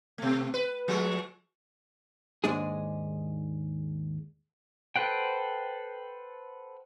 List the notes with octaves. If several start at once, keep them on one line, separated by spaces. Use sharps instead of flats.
B2 A3
B4
F3 G#3 A3
D#2 G#2 G#3 D4 G#4
A4 B4 C5 F#5 G5